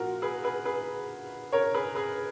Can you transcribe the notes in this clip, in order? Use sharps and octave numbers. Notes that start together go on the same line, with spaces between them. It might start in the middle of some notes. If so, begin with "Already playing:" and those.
Already playing: A#2 F3 F4 F#4 A#4
G#4 B4
G#4 B4
G#4 B4
A#4 C#5
G#4 B4
G#4 B4